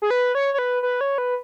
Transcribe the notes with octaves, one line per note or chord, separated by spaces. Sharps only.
G#4
B4
C#5
C#5
B4
B4
C#5
B4